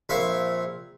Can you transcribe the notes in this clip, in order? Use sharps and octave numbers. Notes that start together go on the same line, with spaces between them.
A#1 C4 E5 F5 C#6